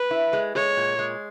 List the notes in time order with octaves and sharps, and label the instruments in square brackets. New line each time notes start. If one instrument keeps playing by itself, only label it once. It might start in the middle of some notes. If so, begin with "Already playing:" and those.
Already playing: [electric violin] B4
[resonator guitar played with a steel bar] E4
G#3
[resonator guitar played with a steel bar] G#3 [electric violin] C#5
[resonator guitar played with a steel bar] A#2
G#3